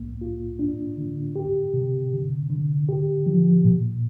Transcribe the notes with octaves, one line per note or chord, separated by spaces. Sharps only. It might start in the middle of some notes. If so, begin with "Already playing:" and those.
Already playing: C2 A#3
F4
D4
D3
G4
C3
D3
D3
G4
F3
A#2